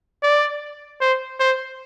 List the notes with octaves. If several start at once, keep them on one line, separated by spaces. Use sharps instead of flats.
D5
C5
C5